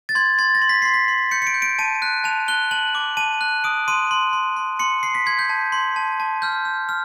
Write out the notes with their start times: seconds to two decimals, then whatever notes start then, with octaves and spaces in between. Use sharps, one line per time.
0.09 A6
0.15 C6 G#6
0.38 C6 A6
0.55 A#6
0.61 C6
0.69 B6
0.82 C6 C7
0.94 B6
1.08 C6
1.31 G6 C#7
1.42 C#7
1.47 D7
1.54 G6
1.62 D7
1.79 A5 D#7
2.02 F#6
2.24 A5 F7
2.48 F#6 G7
2.71 A5 F#7
2.95 D6
3.17 A5 D#7
3.41 F#6
3.64 D#6 D7
3.88 C6 D#7
4.11 C6
4.33 C6
4.57 C6
4.79 C6 C#7
5.03 C6 C7
5.15 B6
5.26 C6 G#6
5.39 G6
5.50 A5
5.72 C6
5.96 A5
6.20 A5
6.42 F6 G6
6.65 F6
6.89 F6